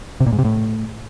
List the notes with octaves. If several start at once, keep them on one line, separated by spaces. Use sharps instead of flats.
C3
A#2
G#2
C3
A2